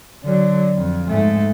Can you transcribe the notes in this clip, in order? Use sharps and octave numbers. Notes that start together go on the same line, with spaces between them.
D3 F#3
F2
G#2 A3